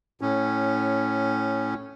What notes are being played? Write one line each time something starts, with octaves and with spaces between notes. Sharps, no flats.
A2 C#4